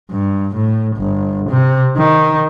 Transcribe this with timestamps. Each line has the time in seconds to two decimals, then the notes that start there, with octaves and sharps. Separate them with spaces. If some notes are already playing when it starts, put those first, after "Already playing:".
0.11 G2
0.55 A2
0.97 G1
1.49 C3
1.98 D#3